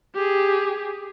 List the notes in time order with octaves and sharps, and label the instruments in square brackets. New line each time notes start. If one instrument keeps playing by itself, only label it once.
[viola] G4 G#4